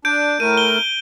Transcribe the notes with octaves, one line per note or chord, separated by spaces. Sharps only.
D4 G6 D7
A2 A3 A#4 D#7
G7